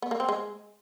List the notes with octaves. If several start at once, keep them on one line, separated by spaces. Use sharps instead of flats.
B3
A#3
C4
G#3